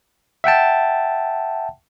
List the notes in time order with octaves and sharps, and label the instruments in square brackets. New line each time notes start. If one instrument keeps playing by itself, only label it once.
[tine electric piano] E5 F#5 G5 A5